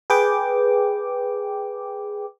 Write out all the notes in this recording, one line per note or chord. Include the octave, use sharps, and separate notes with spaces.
G#4 B4 G5 D6